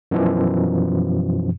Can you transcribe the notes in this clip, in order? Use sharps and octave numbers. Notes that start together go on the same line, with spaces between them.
F#2 B2 E3 F3